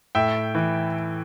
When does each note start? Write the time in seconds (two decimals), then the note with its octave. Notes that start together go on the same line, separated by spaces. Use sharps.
0.15 A2 E5 G5
0.55 E3